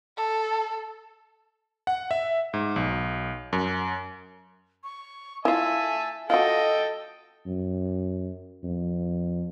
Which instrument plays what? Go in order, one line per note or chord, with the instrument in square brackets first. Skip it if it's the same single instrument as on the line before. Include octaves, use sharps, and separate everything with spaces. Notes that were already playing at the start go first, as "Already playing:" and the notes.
[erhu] A4
[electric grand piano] F#5
E5
G#2
B1
F#2
[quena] C#6
[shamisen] E4 F4 [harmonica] E5 A5 [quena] G#5
[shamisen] F4 F#4 [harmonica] A4 G5 [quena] D#5
[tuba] F#2
F2